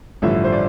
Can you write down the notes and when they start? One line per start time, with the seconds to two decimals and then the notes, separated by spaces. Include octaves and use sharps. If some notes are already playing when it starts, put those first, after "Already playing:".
0.22 A1 G2 D3 F3 E5
0.44 C5
0.52 D5